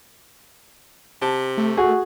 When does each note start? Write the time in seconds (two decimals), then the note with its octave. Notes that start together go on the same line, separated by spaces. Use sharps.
1.22 C3 A5
1.58 A3
1.77 F#4 G#4